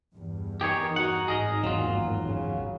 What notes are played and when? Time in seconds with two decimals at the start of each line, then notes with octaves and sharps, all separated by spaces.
0.15 E2 G2
0.61 D#3 G4 G#4 C#5
0.96 D#4 F#4 F#5
1.28 G#1 D#4 G#4 A#4 D#5
1.63 A1 E2 A#2 D#3 F#3 F4
2.24 C#3